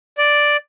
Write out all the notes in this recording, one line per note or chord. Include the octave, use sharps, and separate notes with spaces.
D5